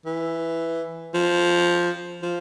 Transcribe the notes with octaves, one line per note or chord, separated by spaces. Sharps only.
E3
F3
F3